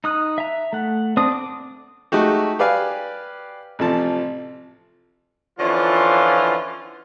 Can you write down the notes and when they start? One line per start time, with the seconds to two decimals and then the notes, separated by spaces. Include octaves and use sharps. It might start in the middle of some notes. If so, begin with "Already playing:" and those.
0.04 D#4 D#6 F#6
0.38 E5 A#5
0.73 A3 F#5
1.17 C4 D4 D#6
1.32 D6
2.12 G#3 A3 D#4 F#4 G4
2.59 G4 B4 D5 F5 G#5
3.79 A1 C3 F3 A5
5.60 D3 E3 F3 C#4 F4